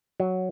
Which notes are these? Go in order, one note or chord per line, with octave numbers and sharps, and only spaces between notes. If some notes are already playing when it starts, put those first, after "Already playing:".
F#3